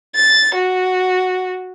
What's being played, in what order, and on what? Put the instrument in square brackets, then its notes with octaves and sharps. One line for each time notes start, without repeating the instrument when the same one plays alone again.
[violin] A6
F#4